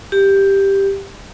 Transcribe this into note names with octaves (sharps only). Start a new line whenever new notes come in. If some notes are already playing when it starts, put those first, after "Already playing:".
G4